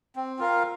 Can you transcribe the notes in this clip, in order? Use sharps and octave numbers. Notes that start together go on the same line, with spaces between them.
C4
F4 A#4 F5